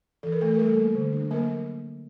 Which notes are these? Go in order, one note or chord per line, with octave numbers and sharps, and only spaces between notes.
E3 A4
A#4
E3 A3 A4
A#4
G3 A3 A4
A#3
D3
D4
F#3 A#3 A#4